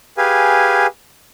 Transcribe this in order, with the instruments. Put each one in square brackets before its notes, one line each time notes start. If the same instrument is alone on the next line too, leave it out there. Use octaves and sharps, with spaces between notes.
[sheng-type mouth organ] G4 G#4 B4 F5 G#5